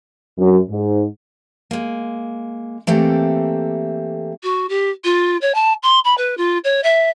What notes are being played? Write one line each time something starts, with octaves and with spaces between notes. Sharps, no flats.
F#2
G#2
G#3 A#3
E3 A3 A#3 C4 G4 A4
F#4
G4
F4
C#5
A5
C6
B5
B4
F4
C#5
E5